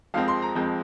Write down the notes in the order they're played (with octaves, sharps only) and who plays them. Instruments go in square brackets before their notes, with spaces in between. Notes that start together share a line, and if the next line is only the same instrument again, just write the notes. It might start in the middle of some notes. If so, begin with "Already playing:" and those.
[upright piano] F2 F3 G#3 C4 F5
C6
A#5
F2 F3 G#3 C4